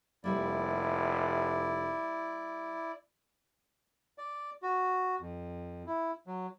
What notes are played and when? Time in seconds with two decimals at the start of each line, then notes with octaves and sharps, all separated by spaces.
0.24 F1 G3 A#3 E4 D5
4.18 D5
4.62 F#4
5.20 F2
5.86 E4
6.27 F#3